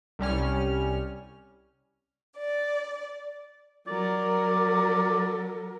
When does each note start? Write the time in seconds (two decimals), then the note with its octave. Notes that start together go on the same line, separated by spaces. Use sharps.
0.19 C2 G3 C#4 F6
2.38 D5
3.88 F#3 A#4 D5